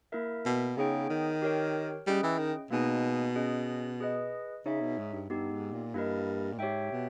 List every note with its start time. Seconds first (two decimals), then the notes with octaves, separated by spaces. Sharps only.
0.12 A#3 E4 A#4 E5
0.46 B2
0.77 C#3 B3 D#4 G#4 C#5 G5
1.10 D#3
1.42 G4 A#4 C#5 G5
2.07 G3 C#4 E4 G#4 D#5 G5
2.23 E3
2.38 D#3
2.71 B2 A#3 D#4 G#4 D#5 G#5
3.35 C#4 G#4 D#5
4.00 G#4 B4 D#5
4.65 C#3 D#4 G#4 C#5 E5
4.81 B2
4.98 G#2
5.13 G2
5.30 G2 B3 D#4 G4
5.51 G#2
5.73 A#2
5.94 G2 A#3 E4 A#4 D#5
6.53 A#2
6.59 G#2 G4 C#5 E5 G5
6.92 B2